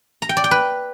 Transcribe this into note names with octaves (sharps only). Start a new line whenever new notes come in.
A#5
G5
D5
G5
B4